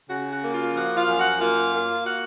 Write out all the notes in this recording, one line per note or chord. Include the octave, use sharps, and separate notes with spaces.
C#3 F#4
F#4
A#3
F4
F3 F#4
F4 F5
F#2
F#4 F#5
A#3 F4 F5
A#3
F#4 F#5